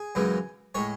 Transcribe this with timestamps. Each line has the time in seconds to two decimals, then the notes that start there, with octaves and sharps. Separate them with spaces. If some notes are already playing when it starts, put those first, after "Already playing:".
Already playing: G#4
0.15 F#2 C#3 E3 G#3
0.75 A2 G#3 C#5